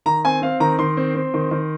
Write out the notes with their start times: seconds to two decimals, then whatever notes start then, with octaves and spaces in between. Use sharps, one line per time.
0.06 D#3 A#5
0.25 C4 G#5
0.42 C4 F5
0.60 D#3 A#5
0.79 D#3 C6
0.97 C4
1.15 C4
1.34 D#3
1.51 D#3